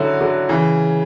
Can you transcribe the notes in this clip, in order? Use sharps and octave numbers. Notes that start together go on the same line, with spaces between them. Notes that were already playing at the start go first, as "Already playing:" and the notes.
Already playing: D3 F#3 C#4 E4 F#4
D3 F#3
C#3 E3